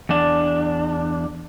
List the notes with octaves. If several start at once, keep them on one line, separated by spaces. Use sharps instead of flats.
E2 D4